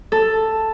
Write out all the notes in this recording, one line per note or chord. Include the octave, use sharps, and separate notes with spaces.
A4